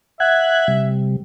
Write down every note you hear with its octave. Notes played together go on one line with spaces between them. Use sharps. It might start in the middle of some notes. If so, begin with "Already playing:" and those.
E5 F#5 F#6 G#6
C3 G3